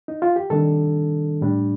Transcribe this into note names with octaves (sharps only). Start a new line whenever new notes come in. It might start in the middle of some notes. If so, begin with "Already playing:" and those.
D#4
F4
G4
C3 D#3 G3 D4 A4
A2 G3 D4